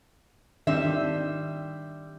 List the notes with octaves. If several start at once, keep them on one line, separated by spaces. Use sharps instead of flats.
D#3 G3 C4 D4 E5